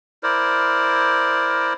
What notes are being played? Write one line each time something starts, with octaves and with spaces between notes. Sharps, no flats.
E4 A#4 C5 D5